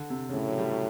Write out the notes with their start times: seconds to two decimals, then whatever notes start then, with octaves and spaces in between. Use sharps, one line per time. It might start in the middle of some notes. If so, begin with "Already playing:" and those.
Already playing: D3
0.10 C3
0.29 C#3
0.34 A2 C3
0.47 F#3
0.58 G3
0.70 F#3